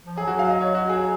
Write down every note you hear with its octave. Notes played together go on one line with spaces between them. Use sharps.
F3
F#3 G#4
F#4
F5
D#5
C#5
F#4
G#4